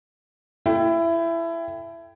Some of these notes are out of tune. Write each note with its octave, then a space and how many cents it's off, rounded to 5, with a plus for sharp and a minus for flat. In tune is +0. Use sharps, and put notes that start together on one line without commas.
E4 +20 A4 +0 G5 +0